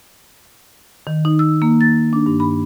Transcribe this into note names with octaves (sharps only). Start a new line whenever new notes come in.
D#3
D#4
E6
A#3
A6
D4
G2
B5